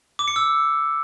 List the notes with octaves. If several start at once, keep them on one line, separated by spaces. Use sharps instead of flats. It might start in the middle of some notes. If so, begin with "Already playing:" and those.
D6
C#7
E6